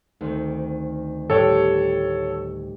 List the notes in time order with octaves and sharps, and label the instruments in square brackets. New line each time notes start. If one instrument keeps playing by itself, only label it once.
[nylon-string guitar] D2 D#3 [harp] C4
[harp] A2 G3 G5 [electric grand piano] A4 C#5